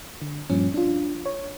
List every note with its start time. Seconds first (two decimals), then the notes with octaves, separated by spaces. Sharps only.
0.22 D3
0.50 G2 A#2 F3 C#4
0.74 D4 F4
1.26 C#5